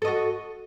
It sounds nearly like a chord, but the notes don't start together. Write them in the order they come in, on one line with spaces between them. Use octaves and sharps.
A4 D#5 F#4